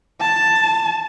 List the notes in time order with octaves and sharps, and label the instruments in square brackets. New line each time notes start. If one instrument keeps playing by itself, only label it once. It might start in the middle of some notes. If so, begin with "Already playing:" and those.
[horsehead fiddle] A5